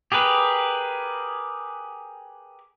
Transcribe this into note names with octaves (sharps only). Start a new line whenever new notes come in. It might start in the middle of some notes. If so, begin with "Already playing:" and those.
G4 G#4 A#4 B4